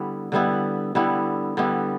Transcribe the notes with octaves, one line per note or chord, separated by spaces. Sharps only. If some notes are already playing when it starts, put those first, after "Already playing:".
Already playing: D3 G3 B3 E4
D3 G3 B3 E4
D3 G3 B3 E4
D3 G3 B3 E4